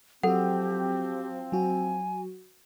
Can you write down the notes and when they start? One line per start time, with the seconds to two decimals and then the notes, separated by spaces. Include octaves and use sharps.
0.23 F3 F#3 C4 F#4 G4 A4 F#5
1.52 F#3 F#4 G#5